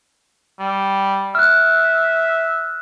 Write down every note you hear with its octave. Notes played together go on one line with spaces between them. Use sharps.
G3
E5 F6 F#6